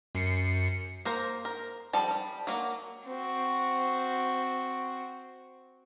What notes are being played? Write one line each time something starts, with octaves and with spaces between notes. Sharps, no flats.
F#2 C7 C#7
A#3 A#4 C5
A#4
F3 G3 A4 A5
G3
F#3 A#3
C4 F#4